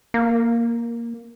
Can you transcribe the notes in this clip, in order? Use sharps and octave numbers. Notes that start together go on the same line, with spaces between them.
A#3